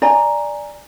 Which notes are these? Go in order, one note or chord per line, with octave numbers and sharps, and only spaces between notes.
D5 G#5 A#5